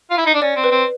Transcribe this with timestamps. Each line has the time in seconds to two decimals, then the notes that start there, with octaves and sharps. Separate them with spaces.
0.10 F4
0.17 E4
0.26 D#4
0.34 D4
0.42 C#4 D5
0.56 C4
0.64 B4
0.71 C4